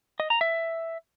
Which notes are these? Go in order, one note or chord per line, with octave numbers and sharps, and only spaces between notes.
D#5
A#5
E5